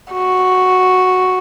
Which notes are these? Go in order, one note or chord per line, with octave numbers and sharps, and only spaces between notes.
F#4